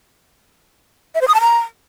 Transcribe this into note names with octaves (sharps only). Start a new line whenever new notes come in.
E5
C5
D#6
A5
A#5